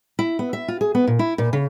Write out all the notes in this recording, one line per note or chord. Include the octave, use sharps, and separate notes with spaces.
E4
B3
E5
F4
G#4
B3
A#2
E4
A#2
C#3